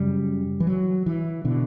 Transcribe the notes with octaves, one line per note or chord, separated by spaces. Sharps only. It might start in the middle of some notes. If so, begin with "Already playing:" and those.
Already playing: F#2 C#3 G3
E3
F#3
E3
B2 D3